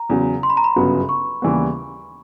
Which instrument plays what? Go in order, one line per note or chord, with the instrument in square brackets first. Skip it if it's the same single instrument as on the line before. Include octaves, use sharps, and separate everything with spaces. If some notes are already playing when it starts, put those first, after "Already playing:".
Already playing: [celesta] A#5
[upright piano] E2 C#3 F#3
[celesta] C6
B5
A#5
B5
[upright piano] G1 F#2 C#3 F#3 B3
[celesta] C#6
[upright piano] D#2 C#3 E3 G3 B3